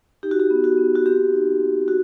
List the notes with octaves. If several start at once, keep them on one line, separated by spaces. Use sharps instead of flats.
D#4 G4
F#4
G4
B3
F#4
B3
F#4
C4 G4
D#4
C4
F#4